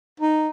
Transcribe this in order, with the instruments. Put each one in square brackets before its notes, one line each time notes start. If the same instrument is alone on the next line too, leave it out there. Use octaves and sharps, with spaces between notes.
[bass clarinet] D#4